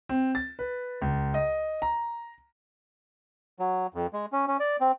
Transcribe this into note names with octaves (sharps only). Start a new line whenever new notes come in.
C4
A6
B4
C#2
D#5
A#5
F#3
F2
G#3
C#4
C#4
D5
C4